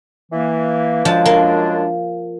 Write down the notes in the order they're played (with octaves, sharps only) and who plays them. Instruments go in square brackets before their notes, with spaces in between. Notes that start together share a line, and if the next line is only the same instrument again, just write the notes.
[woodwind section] E3 A#3
[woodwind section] F#2 G#3 D4 [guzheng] F3 A5
[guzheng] A#3